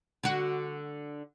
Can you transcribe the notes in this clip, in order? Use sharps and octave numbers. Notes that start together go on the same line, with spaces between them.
D3 F#4